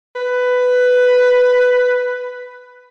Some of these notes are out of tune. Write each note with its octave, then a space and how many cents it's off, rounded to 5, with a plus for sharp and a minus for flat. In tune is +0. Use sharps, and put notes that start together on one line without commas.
B4 +10